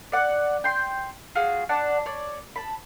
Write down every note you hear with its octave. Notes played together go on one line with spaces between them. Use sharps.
D5 F#5
G5 C6
F4 F#4 G#4
D4 D5 F#5 A5
C#5 D5
A5 B5